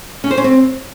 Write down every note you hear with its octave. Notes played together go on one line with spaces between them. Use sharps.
C#4
C5
C#4
C4